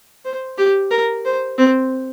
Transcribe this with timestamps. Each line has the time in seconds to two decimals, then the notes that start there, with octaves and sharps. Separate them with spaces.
0.25 C5
0.58 G4
0.91 A#4
1.25 C5
1.58 C4